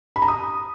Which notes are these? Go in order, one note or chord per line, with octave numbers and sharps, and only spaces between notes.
B5
A#5
D#6